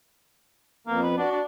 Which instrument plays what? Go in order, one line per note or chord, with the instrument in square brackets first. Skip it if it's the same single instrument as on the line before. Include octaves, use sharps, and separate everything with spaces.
[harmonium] F2 B3 [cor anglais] A#3
[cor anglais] B4
[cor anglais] D4 [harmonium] F#4
[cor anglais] D4